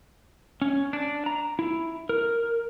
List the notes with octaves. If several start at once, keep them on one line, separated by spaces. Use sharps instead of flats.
C#4
D4
A#5
E4
A#4